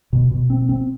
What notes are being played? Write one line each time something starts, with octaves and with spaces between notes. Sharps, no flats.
B2
B2
C4
C4